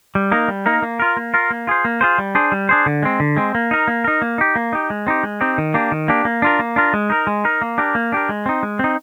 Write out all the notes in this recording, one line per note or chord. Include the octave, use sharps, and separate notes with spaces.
G3
A#3 D#4 A#4
G3
A#3 D#4 A#4
A#3
F4 A#4
A#3
F4 A#4
A#3
F4 G#4 C5
A#3
F4 G#4 C5
G3
D4 G#4 C5
G3
D4 G#4 C5
D3
G#3 C4
D3
G#3 C4
A#3
D#4 A#4
A#3
D#4 A#4
A#3
D#4 G4
A#3
D#4 G4
G#3
C4 D#4 G4
G#3
C4 D#4 G4
D#3
A#3 D4 G4
D#3
A#3 D4 G4
A#3
D4 F4 A#4
A#3
D4 F4 A#4
G#3
D#4 A#4
G#3
D#4 A#4
A#3
D4 G4 A#4
A#3
D4 G4 A#4
G#3
C4 D#4
G#3
C4 D#4